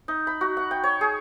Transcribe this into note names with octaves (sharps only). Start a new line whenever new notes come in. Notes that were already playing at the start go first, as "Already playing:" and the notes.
D#4
B5
F#4
F#5
G5
C#5
G#4